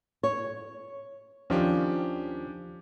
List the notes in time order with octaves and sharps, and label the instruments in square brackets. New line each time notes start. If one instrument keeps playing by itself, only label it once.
[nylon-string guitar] C#5
[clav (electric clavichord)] D#2 D#3 F3 [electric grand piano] C#4 D4 G4